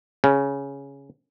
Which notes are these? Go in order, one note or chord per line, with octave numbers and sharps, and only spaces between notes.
C#3